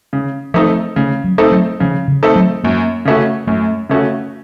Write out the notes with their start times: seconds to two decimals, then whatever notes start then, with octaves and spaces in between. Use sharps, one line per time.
0.13 C#3
0.54 F3 A3 C4 D#4 A4
0.96 C#3 A3
1.24 F#3
1.38 A3 C4 D#4 A4
1.52 F#3
1.80 C#3 F3
2.08 C#3
2.23 A3 C4 D#4 A4
2.36 F#3
2.64 F#2 A#3
3.05 C#3 A3 C#4 F#4
3.47 F#2 A3
3.89 C#3 A3 C#4 F#4